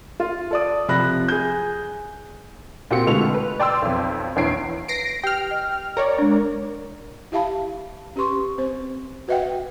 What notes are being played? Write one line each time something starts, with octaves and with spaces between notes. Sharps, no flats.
F4
A4 D5 D#6
C3 F3 B5 F#6 A#6
G#4 G6
A#2 C4 F#4 G4 C#7
B2 D3 G#3 A3 F4 F7
B4
D5 G5 C6 E6
B1 F2
A#1 E2 C#5 C7 D7
B4 A#6 C7 D7
G4 G5 F6
D#5
A#4 C#5 D5
G#3 D4
E4 G4 E5 F5 A5 B5
C#4 G4 B4 C6 C#6
C4 C5
F#4 B4 D#5 E5 F#5 G5